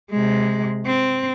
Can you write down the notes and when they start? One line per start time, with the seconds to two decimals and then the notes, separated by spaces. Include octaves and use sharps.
0.11 C3 G#3
0.86 C4